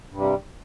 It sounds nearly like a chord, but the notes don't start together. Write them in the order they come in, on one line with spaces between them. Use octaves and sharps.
G2 C3 G3